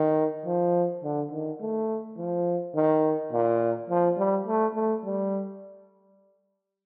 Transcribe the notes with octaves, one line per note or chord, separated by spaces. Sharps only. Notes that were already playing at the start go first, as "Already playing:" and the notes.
Already playing: D#3
F3
D3
D#3
A3
F3
D#3
A#2
F3
G3
A3
A3
G3